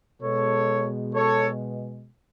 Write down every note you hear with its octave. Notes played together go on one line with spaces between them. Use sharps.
B2 G#3 A4 C#5
A4 C#5